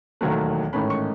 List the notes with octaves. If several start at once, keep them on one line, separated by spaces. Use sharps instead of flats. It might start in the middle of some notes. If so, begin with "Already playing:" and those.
E1 D#2 D#3 F#3 A3
A1 G#2 D#3 A3 C#4 B5
C#6